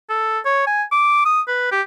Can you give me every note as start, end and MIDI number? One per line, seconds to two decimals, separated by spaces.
0.09 0.39 69
0.45 0.64 73
0.66 0.83 80
0.92 1.25 86
1.25 1.41 87
1.48 1.68 71
1.72 1.81 67